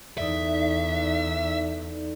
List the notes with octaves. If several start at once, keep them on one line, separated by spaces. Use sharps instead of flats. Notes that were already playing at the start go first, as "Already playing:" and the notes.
E2 D#4 A4 D5 E5